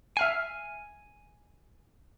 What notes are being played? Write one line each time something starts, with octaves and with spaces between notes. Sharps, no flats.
E5 G#5 F6 C7